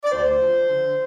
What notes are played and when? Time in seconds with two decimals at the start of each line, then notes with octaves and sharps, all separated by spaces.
0.04 D5
0.10 D2 C5
0.39 F3
0.68 D3